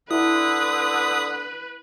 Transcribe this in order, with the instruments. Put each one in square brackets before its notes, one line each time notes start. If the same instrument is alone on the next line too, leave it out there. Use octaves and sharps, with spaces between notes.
[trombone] D3 [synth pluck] E4 [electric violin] B4 [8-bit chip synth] D#6